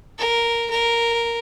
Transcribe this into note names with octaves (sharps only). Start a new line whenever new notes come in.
A#4
A#4